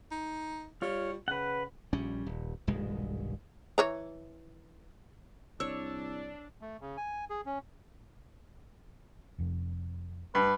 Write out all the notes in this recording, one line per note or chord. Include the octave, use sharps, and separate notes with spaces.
D#4
G3 F4 C#5
C#3 B4 F#5
A#1 G3 C#4
D#1
D#1 B1 G2 G#3
E3 C#5 A#5
C2 D4 C#5 E6
A3
C#3
G#5
G#4
C#4
F1 F2
G2 B4